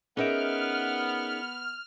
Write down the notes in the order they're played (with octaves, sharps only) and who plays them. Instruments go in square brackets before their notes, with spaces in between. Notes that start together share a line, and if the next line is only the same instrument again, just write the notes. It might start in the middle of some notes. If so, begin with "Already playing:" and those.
[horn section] B3 [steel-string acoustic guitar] C#4 D#4 E5 [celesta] G#4 A#4 D7 [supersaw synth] F6